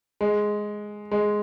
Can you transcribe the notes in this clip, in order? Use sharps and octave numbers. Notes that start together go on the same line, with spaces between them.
G#3
G#3